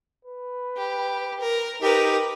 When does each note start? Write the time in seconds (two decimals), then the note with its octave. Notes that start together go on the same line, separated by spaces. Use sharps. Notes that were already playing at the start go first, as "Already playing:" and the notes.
0.25 B4
0.77 G4
1.40 A#4
1.82 D#4 G4 A#4 B4